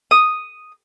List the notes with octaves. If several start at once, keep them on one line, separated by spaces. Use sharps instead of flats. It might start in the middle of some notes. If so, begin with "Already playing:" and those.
D#6